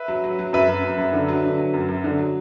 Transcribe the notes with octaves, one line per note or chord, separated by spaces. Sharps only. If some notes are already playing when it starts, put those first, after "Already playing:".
Already playing: B4 E5
F#3
F#3
F#3
F#2 B4 E5
F#2
F#2
F#2
D3
F#3
D3
F#3
F#2
F#2
D3
F#3